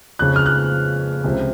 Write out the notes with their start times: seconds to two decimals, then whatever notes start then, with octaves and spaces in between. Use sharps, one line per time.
0.19 F2 C#3 F3 F#6
0.36 F6
0.46 F#6
1.24 C#2 C3 F3